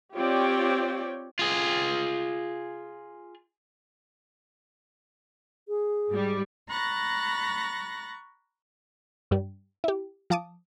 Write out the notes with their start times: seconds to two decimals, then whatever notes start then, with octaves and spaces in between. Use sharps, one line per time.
0.16 C4 F4 G4 C#5 D5 G5
1.39 F4 G#4
5.68 G#4
6.08 G#2 G3
6.68 A#5 B5 C#6 F#6 A6 A#6
9.31 G2 G3
9.84 E4 G4
10.30 F3 F5 A5 D6 D#6